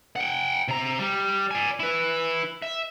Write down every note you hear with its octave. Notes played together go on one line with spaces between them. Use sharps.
F#5 G5
C3 A#5
G3
D5 G#5
E4 B4
E5